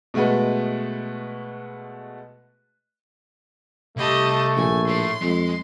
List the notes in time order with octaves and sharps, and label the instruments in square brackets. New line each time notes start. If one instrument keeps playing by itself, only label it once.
[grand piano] B2 G#3 A3 F#4 B4
[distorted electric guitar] C2 B5 [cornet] A3 [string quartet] G4 D#5 A5
[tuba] A#1 [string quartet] G#5
[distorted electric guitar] A2 [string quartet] C6
[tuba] F2 [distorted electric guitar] G#3